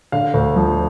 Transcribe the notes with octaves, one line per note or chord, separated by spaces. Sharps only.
D3 F5
D2
F3